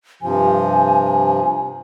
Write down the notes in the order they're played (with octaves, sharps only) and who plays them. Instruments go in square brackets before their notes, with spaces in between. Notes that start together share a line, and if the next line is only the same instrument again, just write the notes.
[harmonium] G2 C3 F3 [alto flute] G#5